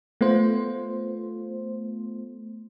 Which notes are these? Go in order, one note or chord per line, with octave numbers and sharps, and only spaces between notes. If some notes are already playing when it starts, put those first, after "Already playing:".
A3 B3 F4 C5